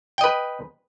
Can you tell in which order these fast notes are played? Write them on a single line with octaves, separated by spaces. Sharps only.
G5 D#5 B4